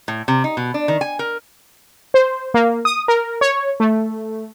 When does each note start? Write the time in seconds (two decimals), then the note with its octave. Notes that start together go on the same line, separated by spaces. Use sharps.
0.08 A2
0.28 C3
0.44 D#4
0.57 B2
0.74 D4
0.88 D#3
1.01 G#5
1.19 A#4
2.14 C5
2.54 A#3
2.85 D#6
3.08 A#4
3.41 C#5
3.80 A3